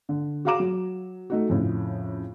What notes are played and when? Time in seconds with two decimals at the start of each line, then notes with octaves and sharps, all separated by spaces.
0.09 D3
0.45 F#4 G#4 F5 A#5 D6 E7
0.60 F#3
1.30 A3 D#4 F#4
1.49 F2 A2 C#3